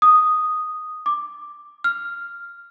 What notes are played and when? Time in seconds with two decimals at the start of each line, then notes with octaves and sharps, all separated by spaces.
0.02 D#6
1.06 D6
1.84 F6